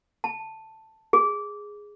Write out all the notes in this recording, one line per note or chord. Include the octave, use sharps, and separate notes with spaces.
A5
G#4